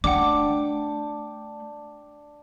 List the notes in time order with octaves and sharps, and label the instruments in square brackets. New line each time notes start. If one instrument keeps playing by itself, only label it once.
[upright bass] A3 [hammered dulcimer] D4 G5 [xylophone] F#5 D6